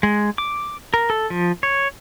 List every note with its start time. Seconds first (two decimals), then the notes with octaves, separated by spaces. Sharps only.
0.03 G#3
0.38 D6
0.94 A#4
1.10 A4
1.30 F3
1.63 C#5